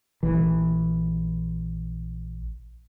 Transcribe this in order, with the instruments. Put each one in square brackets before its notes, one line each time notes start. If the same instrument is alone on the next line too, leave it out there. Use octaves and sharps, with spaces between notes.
[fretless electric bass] A#1 E3